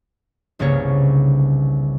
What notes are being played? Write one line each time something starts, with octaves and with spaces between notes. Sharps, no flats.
G1 C2 C#3 A#3 C#5